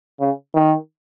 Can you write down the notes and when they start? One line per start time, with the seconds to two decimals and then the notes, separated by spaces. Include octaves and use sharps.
0.20 C#3
0.54 D#3